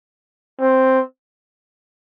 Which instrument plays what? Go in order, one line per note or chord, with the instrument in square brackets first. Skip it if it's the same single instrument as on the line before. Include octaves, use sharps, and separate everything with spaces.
[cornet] C4